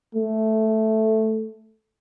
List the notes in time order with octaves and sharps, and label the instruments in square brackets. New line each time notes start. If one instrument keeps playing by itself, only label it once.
[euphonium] A3